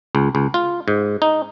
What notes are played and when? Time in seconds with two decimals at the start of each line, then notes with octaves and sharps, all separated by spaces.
0.15 C#2
0.35 C#2
0.54 F4
0.88 G#2
1.22 D#4